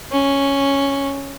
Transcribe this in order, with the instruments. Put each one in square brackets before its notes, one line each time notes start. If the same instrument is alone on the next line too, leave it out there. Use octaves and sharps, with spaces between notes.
[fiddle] C#4